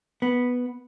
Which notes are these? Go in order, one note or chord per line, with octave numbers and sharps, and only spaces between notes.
B3